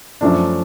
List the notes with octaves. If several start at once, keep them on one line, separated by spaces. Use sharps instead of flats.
F#2 F3 A3 D4